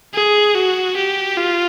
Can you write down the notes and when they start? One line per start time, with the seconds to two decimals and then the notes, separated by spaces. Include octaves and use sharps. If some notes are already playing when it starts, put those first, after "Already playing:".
0.14 G#4
0.54 F#4
0.97 G4
1.37 F4